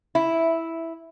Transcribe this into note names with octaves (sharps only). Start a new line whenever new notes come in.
E4